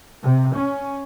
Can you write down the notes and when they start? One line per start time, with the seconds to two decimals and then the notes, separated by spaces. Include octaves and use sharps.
0.24 C3
0.58 C#4